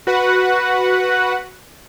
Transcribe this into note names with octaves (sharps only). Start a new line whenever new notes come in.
F#4 B4 F#5